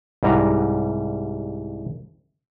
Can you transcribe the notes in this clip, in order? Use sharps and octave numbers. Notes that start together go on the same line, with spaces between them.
C2 G#2 G3 A#5